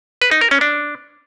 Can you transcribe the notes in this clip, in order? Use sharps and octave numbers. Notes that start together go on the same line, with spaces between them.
B4
D#4
A#4
C#4
D4